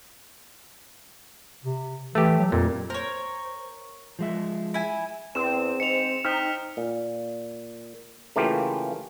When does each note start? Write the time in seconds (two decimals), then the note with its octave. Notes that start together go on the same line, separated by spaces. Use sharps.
1.65 C3
2.15 E3 A3 G4
2.39 F#3
2.52 F2 A#2
2.90 A#4 C5 C#5
4.19 F3 G#3 E5
4.74 E4 G#5
5.35 E2 C4 E7
5.80 G#2 C#7 F7
6.25 C4 D#4 F6 B6
6.77 A#2
8.36 C#3 E3 A3 A#3 F4 G4